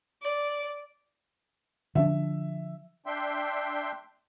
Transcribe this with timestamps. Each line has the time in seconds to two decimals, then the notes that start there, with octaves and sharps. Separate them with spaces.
0.22 D5
1.95 D3 F3 D4 E5
3.06 D4 E5 G5 C6